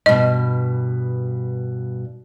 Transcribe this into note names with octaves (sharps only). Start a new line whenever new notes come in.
G2 B2 D#5